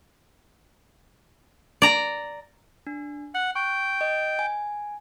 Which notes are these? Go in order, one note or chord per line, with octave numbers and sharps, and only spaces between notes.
D5 A#5
D4
F#5 F#6
G5 C#6
D#5
G#5